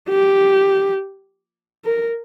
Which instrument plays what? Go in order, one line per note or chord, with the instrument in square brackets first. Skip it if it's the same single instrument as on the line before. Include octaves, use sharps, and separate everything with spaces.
[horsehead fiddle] G4
A#4